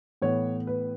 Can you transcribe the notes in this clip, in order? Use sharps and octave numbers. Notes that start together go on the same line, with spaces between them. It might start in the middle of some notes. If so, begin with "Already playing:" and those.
A2 E3 B3 C#5
B4